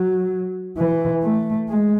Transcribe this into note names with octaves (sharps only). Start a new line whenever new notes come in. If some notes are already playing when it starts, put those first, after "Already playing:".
Already playing: F#3
E3
A3
G#3